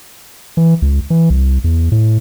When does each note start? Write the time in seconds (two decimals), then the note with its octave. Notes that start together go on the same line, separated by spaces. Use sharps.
0.57 E3
0.82 C#2
1.10 E3
1.30 C2
1.64 E2
1.92 A2